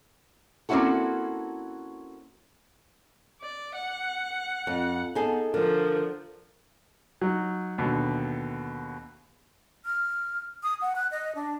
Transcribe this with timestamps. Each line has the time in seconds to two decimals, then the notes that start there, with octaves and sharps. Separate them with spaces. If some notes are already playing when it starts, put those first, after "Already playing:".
0.69 A#3 C4 C#4 E4 F#4 A4
3.42 D5
3.75 F#5
4.67 F2
5.15 B3 D#4 G#4 A4
5.54 D3 F3 A#4
7.21 F#3 D#4
7.78 D#2 B2 D3
9.85 F6
10.63 D#6
10.81 F#5
10.96 F#6
11.11 D#5
11.35 D4